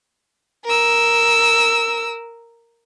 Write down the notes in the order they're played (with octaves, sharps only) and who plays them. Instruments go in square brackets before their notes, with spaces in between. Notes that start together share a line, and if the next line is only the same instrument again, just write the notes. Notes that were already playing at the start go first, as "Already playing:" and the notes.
[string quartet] A#4 E6